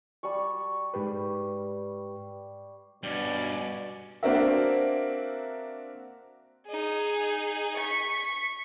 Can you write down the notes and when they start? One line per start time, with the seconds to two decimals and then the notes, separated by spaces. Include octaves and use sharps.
0.23 G3 A5 C#6
0.94 G#2 G4 B4
3.03 G2 B2 C#4 D5
4.23 A#3 C4 D4 F#4 A#4 E5
6.67 D#4 G#4
7.76 C#6 B6